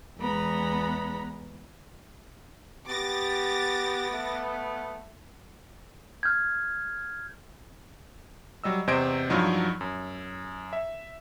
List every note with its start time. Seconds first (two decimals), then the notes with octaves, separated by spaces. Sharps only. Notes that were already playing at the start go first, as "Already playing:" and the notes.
0.18 E2 E3 G#3 B3 A#5 B5
2.88 B3 G4 D6 A6 A#6
4.11 A3
6.23 F6 G6 G#6
8.64 F#3 G3 D#5 E6
8.87 E2 C3 C5 D#5 G#6 D7
9.30 G2 F3 F#3 D#4
9.81 F#2
10.73 E5